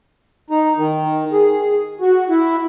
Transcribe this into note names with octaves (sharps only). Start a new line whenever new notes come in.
D#4
D#3
G#4
F#4
E4